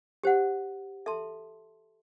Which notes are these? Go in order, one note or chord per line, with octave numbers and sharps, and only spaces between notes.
G4 C5 F#5
A4 E5 A5 C6